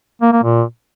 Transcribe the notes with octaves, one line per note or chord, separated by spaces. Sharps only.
A#3
A#3
A#2